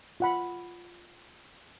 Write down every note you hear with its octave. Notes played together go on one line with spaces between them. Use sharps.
F4 F#5 B5